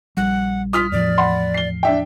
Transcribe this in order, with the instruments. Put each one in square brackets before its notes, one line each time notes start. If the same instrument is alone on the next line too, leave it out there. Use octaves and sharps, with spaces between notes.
[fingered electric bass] A#1 G3 [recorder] F#5
[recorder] F4 [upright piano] D#6 F6 B6
[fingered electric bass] E2 A2 F3 [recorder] D5
[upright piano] F#5 B5 C6
C7 G7
D4 E5 G5